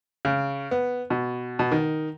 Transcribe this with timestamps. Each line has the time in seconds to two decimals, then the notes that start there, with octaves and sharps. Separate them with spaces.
0.25 C#3
0.71 B3
1.10 B2
1.59 B2
1.72 D#3